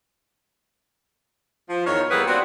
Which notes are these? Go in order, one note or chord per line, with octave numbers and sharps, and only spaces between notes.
F3
E2 D#3 D#4 A#4 C#5
G3 A#3 B3 E4 G#4 B4
B3 C4 D4 F4 F#4